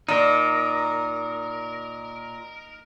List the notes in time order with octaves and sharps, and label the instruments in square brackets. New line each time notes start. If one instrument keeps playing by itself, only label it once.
[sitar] A#2 [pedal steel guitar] D#4 A#4